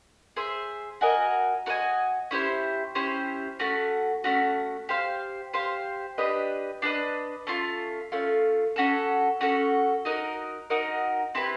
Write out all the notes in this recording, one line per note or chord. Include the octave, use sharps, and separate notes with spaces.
G#4 C5 E5
F#4 A#4 D#5 G#5
F#4 A#4 D#5 G#5
C#4 E4 G4 C5
C#4 E4 G4 C5
A3 C#4 F#4
A3 C#4 F#4
G4 C5 F5
G4 C5 F5
D4 G4 B4 D#5
D4 G4 B4 D#5
A3 C#4 F4
A3 C#4 F4
C#4 F#4 A4
C#4 F#4 A4
D#4 F#4 A#4 D#5
D#4 F#4 A#4 D#5
C4 E4 G4 B4